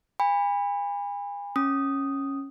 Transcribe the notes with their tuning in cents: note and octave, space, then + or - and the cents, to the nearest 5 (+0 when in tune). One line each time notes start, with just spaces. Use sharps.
G#5 -40 B5 +0
C#4 -10 D#6 +0